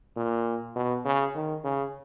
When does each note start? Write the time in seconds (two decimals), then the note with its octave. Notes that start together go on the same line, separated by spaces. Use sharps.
0.17 A#2
0.76 B2
1.05 C#3
1.35 D#3
1.64 C#3